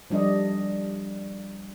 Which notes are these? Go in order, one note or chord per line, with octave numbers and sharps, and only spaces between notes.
F3 G3 D4 D5 D#5